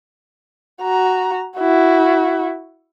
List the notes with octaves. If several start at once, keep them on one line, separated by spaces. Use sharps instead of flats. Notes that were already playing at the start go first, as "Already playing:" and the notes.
F#4 A#5
E4 F#4